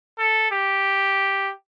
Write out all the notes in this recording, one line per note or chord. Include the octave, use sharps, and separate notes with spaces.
A4
G4